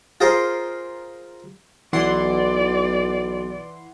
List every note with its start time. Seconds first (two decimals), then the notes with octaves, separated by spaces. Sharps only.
0.21 F4 G#4 A#4 C5 C6
1.93 B1 E3 D5 F#5 C6